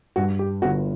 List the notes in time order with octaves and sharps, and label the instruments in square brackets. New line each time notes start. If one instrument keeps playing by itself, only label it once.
[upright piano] G2 [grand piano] F#4
[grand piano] G4
[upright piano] G1 [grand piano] F#4